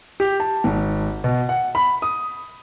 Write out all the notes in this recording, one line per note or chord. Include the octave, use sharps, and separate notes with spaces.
G4
A5
G#1
B2
F#5
B5
D#6